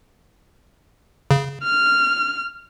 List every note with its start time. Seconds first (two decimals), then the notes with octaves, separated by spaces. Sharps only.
1.31 C#3
1.63 F6